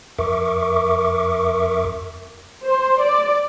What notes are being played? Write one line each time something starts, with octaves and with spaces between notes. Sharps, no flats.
F2 A#4 E5 C#6 D6
C5
D5